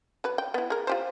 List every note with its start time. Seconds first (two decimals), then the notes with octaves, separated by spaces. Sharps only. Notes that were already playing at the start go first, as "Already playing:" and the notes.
0.24 F#3 B4
0.38 G5
0.54 B3 E4
0.70 G#4 A#4
0.87 F4 G4 C5